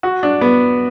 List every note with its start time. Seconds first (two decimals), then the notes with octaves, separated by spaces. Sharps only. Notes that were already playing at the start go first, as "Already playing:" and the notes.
0.03 F#4
0.23 D4
0.41 B3